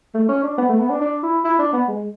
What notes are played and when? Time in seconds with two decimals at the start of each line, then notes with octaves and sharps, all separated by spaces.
0.15 A3
0.29 C#4
0.43 D4
0.58 B3
0.69 A3
0.79 B3
0.90 D4
1.01 D4
1.23 E4
1.44 E4
1.59 D4
1.73 B3
1.88 G#3